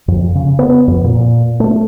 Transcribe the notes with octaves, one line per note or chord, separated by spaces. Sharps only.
F2
C#3
B3
F2
A#2
A3